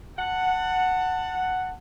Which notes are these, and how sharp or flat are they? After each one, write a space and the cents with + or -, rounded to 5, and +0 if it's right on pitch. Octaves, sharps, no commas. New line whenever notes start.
F#5 +0 A5 +25